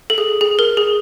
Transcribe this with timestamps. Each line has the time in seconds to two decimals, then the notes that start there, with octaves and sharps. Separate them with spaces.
0.10 A4
0.18 G#4
0.41 G#4
0.59 A#4
0.77 G#4